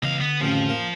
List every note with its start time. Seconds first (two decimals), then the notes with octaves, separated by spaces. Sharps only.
0.03 C#2 C#3 E3 B3 D#5 F5
0.21 D3 B3
0.41 A1 F2 C#3 F3
0.69 A#3